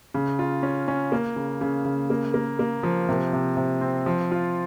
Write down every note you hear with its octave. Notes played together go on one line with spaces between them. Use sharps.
C#3
F4
C#4
C#4
A#3
C#3
C#3
C#3
A#3
A#3
A#3
F3
C3
C3
C3
C4
F3
F4